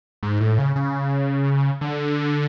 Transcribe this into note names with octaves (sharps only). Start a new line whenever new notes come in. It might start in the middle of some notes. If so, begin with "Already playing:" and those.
G#2
A2
C#3
C#3
D3